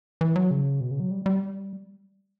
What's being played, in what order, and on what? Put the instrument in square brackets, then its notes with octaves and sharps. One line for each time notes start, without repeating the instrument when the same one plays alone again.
[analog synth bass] E3
F#3
C#3
B2
C#3
F#3
G3
G3